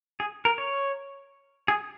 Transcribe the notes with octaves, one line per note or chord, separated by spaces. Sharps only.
G#4
A#4
C#5
G#4